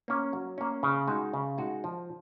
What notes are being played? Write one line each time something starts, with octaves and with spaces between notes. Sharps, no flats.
A#3 C#4
F#3
A#3 C#4
C#3
G#3 D#4 F#4
C#3
G#3 D#4 F#4
F3